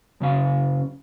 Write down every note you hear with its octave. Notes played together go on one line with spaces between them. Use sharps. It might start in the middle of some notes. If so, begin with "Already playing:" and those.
F#2 C#3 C#4 F5